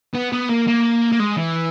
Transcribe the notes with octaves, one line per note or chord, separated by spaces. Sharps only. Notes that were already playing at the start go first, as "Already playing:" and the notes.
B3
B3
A#3
A#3
A#3
G#3
E3